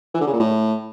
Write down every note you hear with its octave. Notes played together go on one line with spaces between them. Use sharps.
E3
D3
C#3
A#2
A2